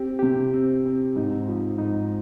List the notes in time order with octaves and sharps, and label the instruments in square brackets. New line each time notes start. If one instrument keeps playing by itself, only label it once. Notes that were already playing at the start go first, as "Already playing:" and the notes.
Already playing: [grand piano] C4 [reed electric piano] G4
[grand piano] C3 [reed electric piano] G4
[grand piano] C4
C4
[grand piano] G#2 [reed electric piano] D#4
[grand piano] F3
[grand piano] G#2 [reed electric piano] D#4